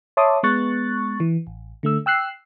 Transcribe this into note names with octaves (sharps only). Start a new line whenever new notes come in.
C#5 E5 A5 C6 D6 D#6
G#3 B3 C#6 F#6 A6
E3
A1
D3 A3 E6
G5 E6 F#6 C7